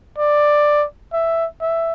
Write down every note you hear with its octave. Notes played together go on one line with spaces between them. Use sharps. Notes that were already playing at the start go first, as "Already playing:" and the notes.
D5
E5
E5